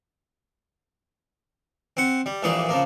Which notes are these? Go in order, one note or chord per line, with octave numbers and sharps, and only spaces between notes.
C4 F#5
G3
A#1 A#2 E3 G4 G#4
C#3 F3 A#3